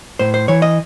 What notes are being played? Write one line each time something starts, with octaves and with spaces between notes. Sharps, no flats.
A2 C5
C5
E3 C#5
D#5